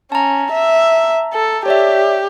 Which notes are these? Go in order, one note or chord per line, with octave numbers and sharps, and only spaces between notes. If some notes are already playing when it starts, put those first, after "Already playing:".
C#4 A5 A#5
E5
A4
G4 C#5 D5 E5